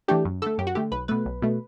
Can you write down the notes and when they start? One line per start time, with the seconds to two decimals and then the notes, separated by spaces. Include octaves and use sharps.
0.08 E3 A3 D4 G4
0.25 F#2
0.42 D3 A3 A4
0.58 F#2 G4
0.67 F#4
0.75 D3 A3 G4
0.92 B1 B4
1.08 B2 A3 B4
1.26 B1
1.42 B2 A3